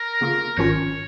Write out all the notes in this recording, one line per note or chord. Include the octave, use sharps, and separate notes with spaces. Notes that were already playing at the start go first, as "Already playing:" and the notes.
Already playing: A#4
C#3 A#3 F4 G#4
G#1 G#2 D#3 C#4 F4 C#5